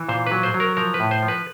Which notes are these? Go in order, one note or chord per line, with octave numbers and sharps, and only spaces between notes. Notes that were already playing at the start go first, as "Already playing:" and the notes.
Already playing: E3
A#2 C5
F#3 B4
C5
F#3
A#4
F3 A#4
B4
A2
C5
F3
B4